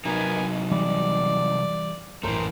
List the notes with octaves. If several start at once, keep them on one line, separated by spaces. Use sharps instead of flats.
C3 F#3 B3 D#4 A#4 G#5
E3 G3 D5
A#1 F#2 A2 E3 A3 A#4 C5